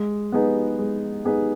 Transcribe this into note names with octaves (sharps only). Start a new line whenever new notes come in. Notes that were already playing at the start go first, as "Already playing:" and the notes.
Already playing: G#3
B3 D#4 G#4 B4
G#3
B3 D#4 G#4 B4